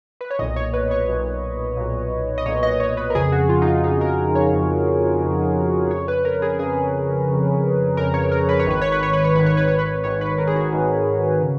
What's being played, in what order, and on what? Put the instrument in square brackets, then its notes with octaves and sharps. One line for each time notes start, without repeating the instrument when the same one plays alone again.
[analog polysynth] B4
C#5
B1 A#2 D#5
C#5
B4
C#5
B1 A#2
B1 A#2
D#5
B1 A#2 C#5
D#5
C#5
B4
A#4
F2 C#3 G#4
F#4
F4
D#4
F4
F2 C#3 D#4
A#4
C#5
F2 C#3
F2 C#3
F2 C#3 C#5
B4
A#4
G#4
F2 C#3 G#4
F2 C#3
F2 C#3 A#4
C#5
A#4
B4
C#5
G#1 G#2 D#3 B4
C#5
B4
C#5
B4
C#5
G#1 G#2 D#3 B4
C#5
B4
C#5
B4
G#1 G#2 D#3 C#5
B4
A#4
G#4
F#4
G#1 G#2 D#3
C#3